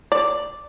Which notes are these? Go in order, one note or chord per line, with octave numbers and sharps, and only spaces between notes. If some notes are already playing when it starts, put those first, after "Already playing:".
D5